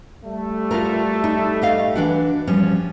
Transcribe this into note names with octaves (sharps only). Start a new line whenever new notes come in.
G3 A3
F4 F#4 A#4
D#4
G4 D#5 F5
E3 D4 F#4
F3 G3 C#4